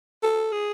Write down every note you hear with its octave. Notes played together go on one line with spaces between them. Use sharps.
A4
G#4